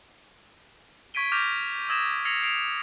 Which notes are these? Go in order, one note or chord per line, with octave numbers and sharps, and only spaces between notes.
C#6 G#6 B6 D7 D#7 G7
C#6 D6 F6 G6 A#6 F7
D#6 E6 G#6 A#6 E7
E6 G#6 A#6 C7 C#7 F7
C7 D7 F7